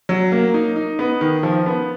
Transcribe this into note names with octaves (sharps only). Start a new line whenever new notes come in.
F#3
A#3
D#4
D#4
B3
D#3
F3
B3